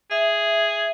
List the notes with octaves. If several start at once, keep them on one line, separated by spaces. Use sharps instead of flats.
G#4 E5